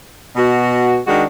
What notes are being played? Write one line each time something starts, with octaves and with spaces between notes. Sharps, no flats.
B2 F#4
D#3 G#3 D4 F#4